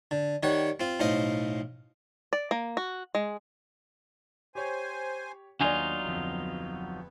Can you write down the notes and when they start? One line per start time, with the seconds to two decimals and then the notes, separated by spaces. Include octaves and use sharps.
0.11 D3
0.43 D#3 G3 C#5 F#5
0.80 C4 F4
1.00 B1 A2 C5 D#5 F5
2.33 D5
2.51 A#3
2.77 F#4
3.15 G#3
4.55 G4 C5 C#5 G#5
5.61 D#2 F#3 B3 D4 D#4 F4 D5
6.04 D1 F2